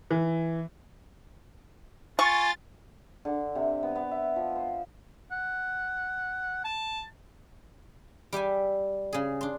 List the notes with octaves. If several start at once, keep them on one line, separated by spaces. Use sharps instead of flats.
E3
F4 G#5 C#6 A6
D3
C3
B3
B3
E5
F3
C5
F#5
A5
G3 G4 E5 G#5
C#3 G#4
D4 C6